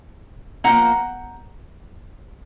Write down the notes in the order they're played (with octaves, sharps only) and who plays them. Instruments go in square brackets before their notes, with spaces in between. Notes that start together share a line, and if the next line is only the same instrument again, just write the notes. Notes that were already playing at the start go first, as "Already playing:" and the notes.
[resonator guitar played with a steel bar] A#2 F3 A#3 F#5 A#5